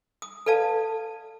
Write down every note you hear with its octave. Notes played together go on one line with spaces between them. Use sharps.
D#6
A4 B4 D5 F5 A5